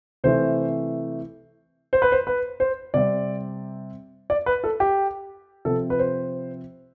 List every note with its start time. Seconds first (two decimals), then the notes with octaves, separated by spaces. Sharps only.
0.24 C3 E3 A3 C5
1.93 C5
2.02 B4
2.12 C5
2.27 B4
2.60 C5
2.94 C3 G3 C4 D5
4.30 D5
4.46 B4
4.64 A4
4.80 G4
5.65 C3 F3 C4 A4
5.90 B4
5.99 C5